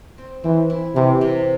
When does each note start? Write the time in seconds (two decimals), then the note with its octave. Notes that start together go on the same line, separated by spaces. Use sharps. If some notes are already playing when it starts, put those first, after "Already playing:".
0.18 C4
0.44 E3 C4
0.70 E4
0.95 C3 E3
1.21 C3